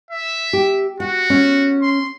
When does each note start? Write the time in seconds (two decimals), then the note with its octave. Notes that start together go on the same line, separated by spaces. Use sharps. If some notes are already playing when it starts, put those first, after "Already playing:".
0.11 E5
0.53 G4
1.00 F#4 F#5
1.30 C#4
1.82 C6